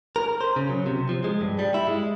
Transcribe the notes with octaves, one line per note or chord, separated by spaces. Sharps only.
A#4
C5
C#3
F#3
C3
F3
G#3
G2
G3
E4
G#3